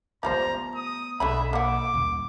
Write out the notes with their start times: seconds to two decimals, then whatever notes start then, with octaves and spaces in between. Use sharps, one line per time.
0.23 F3 G3 A3 B3 C5 A#5
0.75 D#6
1.20 B1 D3 G#3 E5 B5
1.53 A#3 F#5 D6
1.94 D#1 D#2